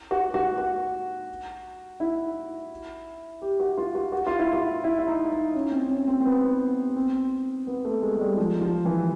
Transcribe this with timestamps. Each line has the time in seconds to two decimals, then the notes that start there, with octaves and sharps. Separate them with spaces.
0.11 F#4
0.34 F#4
0.58 F#4
2.00 E4
3.42 G4
3.60 F#4
3.77 F4
3.95 F#4
4.12 F#4
4.27 F4
4.39 E4
4.53 F4
4.84 E4
4.98 E4
5.07 D#4
5.31 D#4
5.54 C#4
5.72 C4
5.90 C#4
6.08 C4
6.21 C4
6.25 B3
6.96 C4
7.67 B3
7.85 A3
8.02 G#3
8.16 G#3
8.21 G3
8.37 F3
8.61 F3
8.85 E3